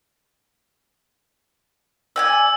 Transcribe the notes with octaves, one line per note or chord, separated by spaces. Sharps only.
D5 G5 G#5 E6